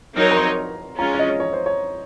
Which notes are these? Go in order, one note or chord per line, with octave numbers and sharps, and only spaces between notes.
F#3 C4 D#4 A#4 C#5 F6
A#5
C6
G#3 C#4 F4 A#5
C#5
D#5
C#5
C5
C#5